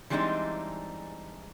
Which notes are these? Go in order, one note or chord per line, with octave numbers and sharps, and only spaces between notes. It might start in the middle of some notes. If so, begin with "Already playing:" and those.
E3 G3 G#3 C4 D4 D#4